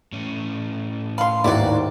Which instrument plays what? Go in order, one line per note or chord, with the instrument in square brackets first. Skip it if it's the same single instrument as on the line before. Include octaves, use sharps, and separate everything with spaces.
[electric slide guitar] A2 C#4
[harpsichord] F5 [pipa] B5 C6
[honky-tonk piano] D#2 G#2 [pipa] F#3 E4 [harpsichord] F#4 D5